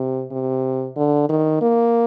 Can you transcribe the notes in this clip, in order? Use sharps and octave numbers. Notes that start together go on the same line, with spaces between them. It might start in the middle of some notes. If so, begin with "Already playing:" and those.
Already playing: C3
C3
D3
D#3
A#3